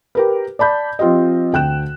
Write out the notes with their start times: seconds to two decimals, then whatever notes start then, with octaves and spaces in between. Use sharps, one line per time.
0.15 G4 A#4 B4
0.59 D5 A5 B5 G6
0.99 F3 C4 F4 G4 D#5
1.53 D2 G5 F#6 E7